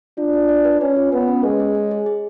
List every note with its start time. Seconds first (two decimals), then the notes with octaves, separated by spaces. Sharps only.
0.18 D4 F4
0.33 F4
0.49 D5
0.65 B4
0.81 C#4 B4
0.96 F4
1.12 B3 B4
1.28 C#4
1.44 G#3 C#5
1.60 G#4
1.75 C#5
1.91 G#4
2.06 G#4